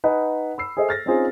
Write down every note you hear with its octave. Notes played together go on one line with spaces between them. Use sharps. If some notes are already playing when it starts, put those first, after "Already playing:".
D#4 B4 D#5 F#5 G#5
B5 E6 C7
G#4 A4 C5 D#5 E5
F6 A6 A#6
C4 C#4 D#4 F4 G#4 C5